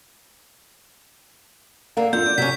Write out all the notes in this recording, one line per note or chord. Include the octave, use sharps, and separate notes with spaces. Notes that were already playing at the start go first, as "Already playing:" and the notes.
D3 A#3 F5
F2 A#3 D4 F4 G6
D5
C3 F#3 C#4 B6